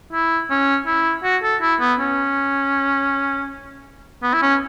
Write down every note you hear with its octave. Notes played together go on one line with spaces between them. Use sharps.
E4
C#4
E4
F#4
A4
E4
B3
C#4
B3
E4
C#4